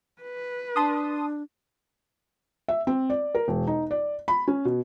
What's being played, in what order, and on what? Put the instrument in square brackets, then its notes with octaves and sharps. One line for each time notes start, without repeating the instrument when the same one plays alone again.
[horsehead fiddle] B4
[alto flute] D4 [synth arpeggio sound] A5 C6 D#6
[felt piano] E5
C4
D5
A#4
E1
D#4
D5
B5
C#4
B2